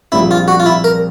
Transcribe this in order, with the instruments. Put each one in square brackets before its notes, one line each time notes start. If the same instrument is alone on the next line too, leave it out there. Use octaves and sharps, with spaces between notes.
[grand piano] A#1 A#2 G3 C4 [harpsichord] E4
[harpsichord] F4
F#4
F4
E4
A#4